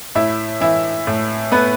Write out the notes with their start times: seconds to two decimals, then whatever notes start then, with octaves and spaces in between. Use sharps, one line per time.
0.15 A2 E4 E5
0.61 E3 E4 E5
1.07 A2
1.52 A3 B3 B4